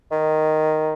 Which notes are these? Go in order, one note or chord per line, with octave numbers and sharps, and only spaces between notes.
D#3